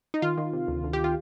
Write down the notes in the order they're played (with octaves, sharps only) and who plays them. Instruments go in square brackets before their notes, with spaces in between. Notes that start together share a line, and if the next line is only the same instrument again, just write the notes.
[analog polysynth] D#4
D#3 F4
D#3
C3
D2
D2
G4
F4